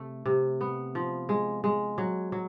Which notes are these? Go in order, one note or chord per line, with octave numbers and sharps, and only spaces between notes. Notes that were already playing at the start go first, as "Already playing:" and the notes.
Already playing: C3 A3
C3
B3
F3
G#3
G#3
F#3
F#3